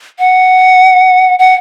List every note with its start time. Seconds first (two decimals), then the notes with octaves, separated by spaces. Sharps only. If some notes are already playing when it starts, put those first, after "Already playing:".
0.19 F#5
1.39 F#5